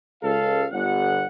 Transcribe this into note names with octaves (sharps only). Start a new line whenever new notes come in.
C#2 A4 F5
G1 F#5